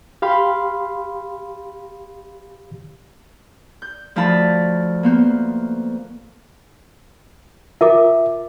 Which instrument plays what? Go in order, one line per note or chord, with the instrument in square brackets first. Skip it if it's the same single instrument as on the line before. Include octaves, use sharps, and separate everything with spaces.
[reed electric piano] G4 F5 B5 C6
[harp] G6
D2 F3 F4 A5 B5
A#3 B3 C5
[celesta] F4 A#4 D6 [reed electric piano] E5